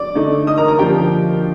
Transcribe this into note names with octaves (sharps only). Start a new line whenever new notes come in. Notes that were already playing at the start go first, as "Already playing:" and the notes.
Already playing: D5 D6
D3 A3 D#4
D#5 D#6
A#4 A#5
A#4 A#5
D3 F3 A#3 D4 G4 G5